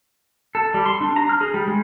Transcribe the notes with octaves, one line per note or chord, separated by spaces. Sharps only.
A4
G3
C6
D4
A#5
F6
G#4
G3
G#3